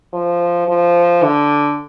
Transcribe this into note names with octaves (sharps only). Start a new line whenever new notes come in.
F3
F3
D3